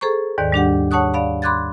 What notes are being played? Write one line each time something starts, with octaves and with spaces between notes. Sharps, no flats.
G#4 A4 C5 A#5 C#6
D#2 G#2 D#3 D5
G3 D4 G4 F#5
C#5 F#5 A5 C#6 D#6 F#6
D5 F5 B5
B5 C6 D6 F#6 G#6 A6